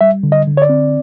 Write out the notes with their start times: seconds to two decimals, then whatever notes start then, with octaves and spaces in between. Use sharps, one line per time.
0.01 G3 E5
0.23 D3
0.32 D#5
0.47 D3
0.57 C#5
0.62 D5
0.69 C4